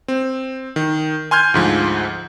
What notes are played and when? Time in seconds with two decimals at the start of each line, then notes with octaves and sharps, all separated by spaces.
0.08 C4
0.76 D#3
1.31 G#5 C6 F6 G6 G#6
1.54 D2 G#2 F3